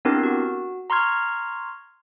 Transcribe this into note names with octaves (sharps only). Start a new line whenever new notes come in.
B3 C4 D4 E4 G4 A#4
F#4
A#5 C6 C#6 F6 G#6